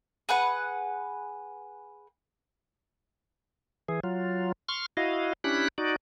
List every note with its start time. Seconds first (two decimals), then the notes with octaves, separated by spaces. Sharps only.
0.29 G#4 B4 F#5
3.88 E3 G#4
4.03 F#3 F4
4.69 C6 C#6 F6
4.97 E4 F#4 D#5 F5
5.44 C#4 D4 E4 G4 B5 F#6
5.78 D#4 F#4 D5